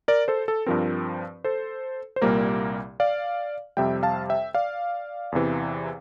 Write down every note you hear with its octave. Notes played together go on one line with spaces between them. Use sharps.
A#4 D5
A4 C5
A4
G2 F3 C4 A#4
A4 C5
C5
C2 A#2 G3 A#3 A#4
D5 F5
F2 C3 G3 E5 G5
F5 A5
E5 G5
D5 F5
E2 C3 E3